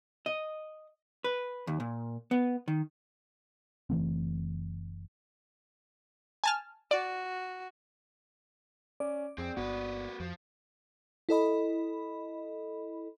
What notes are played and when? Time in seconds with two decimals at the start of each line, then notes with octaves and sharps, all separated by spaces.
0.26 D#5
1.24 B4
1.67 D#2
1.80 A#2
2.31 B3
2.68 D#3
3.90 F#1 E3 A3 C4
6.44 G#5 A5 F6
6.91 F#4 D5
9.00 C#4 D5
9.38 F2 C4 G#4 G5
9.57 G1 G2 A#3 B3 F#4 B4
10.20 F2 F3
11.29 E4 A4 D#5 B5